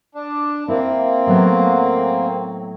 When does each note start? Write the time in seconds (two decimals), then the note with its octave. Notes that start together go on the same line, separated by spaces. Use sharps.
0.15 D4
0.68 A#3 C4 E4
1.26 A2 F#3 B3